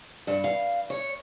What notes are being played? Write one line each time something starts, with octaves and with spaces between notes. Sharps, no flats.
G2
F5
C#5